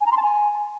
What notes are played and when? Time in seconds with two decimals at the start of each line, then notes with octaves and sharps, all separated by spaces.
0.01 G#5
0.06 A#5
0.12 C6
0.17 A5
0.22 G#5